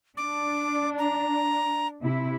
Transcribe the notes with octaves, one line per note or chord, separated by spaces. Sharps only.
D4 D6
A#5
C3 E4